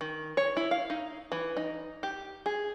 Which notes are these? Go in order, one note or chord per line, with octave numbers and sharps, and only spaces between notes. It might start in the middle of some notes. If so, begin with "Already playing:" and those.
D#3
C#5
E4
F5
D#4
E3
D#4
G4
G#4